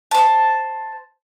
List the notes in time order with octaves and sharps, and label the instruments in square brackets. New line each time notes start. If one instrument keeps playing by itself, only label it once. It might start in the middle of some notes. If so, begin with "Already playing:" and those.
[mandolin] C5 A5